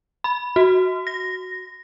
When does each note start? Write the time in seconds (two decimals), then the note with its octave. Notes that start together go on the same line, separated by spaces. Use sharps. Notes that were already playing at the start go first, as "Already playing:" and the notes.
0.24 B5
0.56 F#4
1.07 A#6